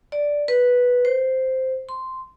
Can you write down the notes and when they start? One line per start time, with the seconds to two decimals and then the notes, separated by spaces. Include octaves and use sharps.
0.12 D5
0.48 B4
1.05 C5
1.89 C6